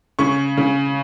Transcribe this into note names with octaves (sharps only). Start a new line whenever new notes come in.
C#3 C#6
C#3